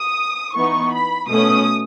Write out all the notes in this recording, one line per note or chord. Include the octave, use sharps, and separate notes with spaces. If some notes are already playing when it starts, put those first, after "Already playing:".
Already playing: D#6
E3 B3 D#4 C#6
B5
B2 A3 C#4 D#6